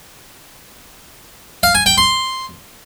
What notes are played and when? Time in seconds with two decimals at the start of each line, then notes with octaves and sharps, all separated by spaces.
1.63 F5
1.75 G#5
1.86 G5
1.98 C6